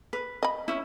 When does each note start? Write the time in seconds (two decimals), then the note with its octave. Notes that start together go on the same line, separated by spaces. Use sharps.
0.13 B4
0.43 D#5 B5
0.68 C#4 E4